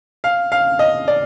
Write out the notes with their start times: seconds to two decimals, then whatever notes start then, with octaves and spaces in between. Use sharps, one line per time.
0.24 F5
0.52 F5
0.79 D#5
1.08 D5